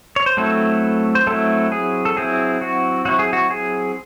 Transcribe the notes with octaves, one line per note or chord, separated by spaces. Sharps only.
C#5
C5
F#3 A3 C4 E4 A4
C5
F#3 A3 C4 E4 A4
G#4
A4
F#3 C4 E4 G#4
F#4
F#3 C4 E4 F#4
G#4
F#4
G#4